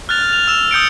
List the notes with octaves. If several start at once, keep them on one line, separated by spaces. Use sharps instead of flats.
F6 F#6 A6 F7
F7
E6 E7
D#6 G6 C#7 D7